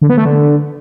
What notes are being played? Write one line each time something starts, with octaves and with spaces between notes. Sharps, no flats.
D3
B3
A3
D3